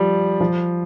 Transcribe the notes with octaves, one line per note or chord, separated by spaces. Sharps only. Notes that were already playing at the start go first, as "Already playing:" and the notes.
Already playing: F3 G3
F3